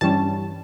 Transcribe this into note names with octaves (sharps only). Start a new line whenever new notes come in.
G2 E3 G3 C#4 A5